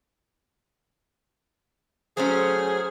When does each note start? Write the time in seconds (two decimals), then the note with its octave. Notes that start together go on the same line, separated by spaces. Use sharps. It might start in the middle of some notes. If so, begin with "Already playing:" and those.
2.17 F#3 A3 C#4 G#4 C5